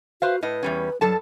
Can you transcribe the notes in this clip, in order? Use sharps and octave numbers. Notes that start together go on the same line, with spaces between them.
F#4 B4 C5 F5
A2 B4 D#5
E2 G3 C#4
G2 F#3 A4 A5